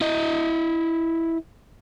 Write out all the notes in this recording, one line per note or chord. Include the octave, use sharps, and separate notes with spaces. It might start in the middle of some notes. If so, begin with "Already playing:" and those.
E4 D#5